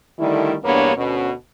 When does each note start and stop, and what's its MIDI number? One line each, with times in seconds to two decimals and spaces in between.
0.19 0.55 50
0.19 0.55 51
0.19 0.55 55
0.19 0.55 57
0.19 0.55 64
0.64 0.96 40
0.64 0.96 43
0.64 0.96 58
0.64 0.96 59
0.64 0.96 62
0.64 0.96 73
0.97 1.32 38
0.97 1.32 47
0.97 1.32 61